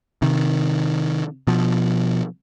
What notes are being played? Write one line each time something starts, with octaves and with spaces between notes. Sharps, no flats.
C3 D#3
B2 F3